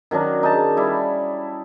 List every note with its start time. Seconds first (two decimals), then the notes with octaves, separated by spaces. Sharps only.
0.11 D#3 F#3 C#4 D4
0.43 D#4 G#4 A5
0.77 G3 E4